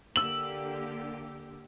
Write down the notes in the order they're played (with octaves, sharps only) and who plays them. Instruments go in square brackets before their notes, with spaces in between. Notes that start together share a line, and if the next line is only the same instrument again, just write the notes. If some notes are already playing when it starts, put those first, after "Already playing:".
[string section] D3 A#3 G4 [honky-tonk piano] E6 F#7